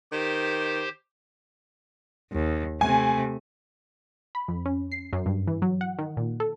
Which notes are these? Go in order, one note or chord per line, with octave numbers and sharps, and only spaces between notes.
D#3 G4 C5
D#2
C3 A3 G#5
B5
F2
C#4
C7
F#2
G2
E3
F#3
F#5
D#3
A#2
A4